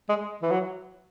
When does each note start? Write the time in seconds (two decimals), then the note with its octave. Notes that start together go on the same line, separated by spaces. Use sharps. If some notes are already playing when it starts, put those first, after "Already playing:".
0.09 G#3
0.42 E3
0.51 F#3